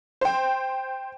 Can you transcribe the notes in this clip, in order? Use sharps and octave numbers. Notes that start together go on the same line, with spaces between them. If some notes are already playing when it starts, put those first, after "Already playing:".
C5 G5